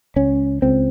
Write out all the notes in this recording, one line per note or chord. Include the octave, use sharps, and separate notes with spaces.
C#2 C#4
C#2 C4